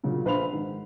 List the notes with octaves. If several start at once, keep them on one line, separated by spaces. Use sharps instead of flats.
A#2 C#3 F#3
A#1 B4 C5 F5 B5 F7
G#2 D#3